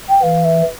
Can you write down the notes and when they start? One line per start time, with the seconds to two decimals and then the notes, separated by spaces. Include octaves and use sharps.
0.09 G5
0.23 E3 F5
0.45 E5